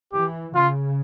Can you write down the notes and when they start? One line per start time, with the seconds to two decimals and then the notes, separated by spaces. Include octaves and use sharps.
0.12 E3 G4
0.55 C#3 F4